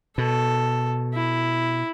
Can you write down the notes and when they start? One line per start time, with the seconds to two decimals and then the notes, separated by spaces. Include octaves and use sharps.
0.18 B2 A4
1.14 E4